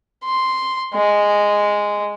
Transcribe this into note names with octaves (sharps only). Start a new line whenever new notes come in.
C6
G#3